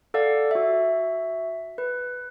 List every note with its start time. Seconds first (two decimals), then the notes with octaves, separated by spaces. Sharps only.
0.14 A4 D5 F5 F#5
0.51 F#4 E5
1.78 B4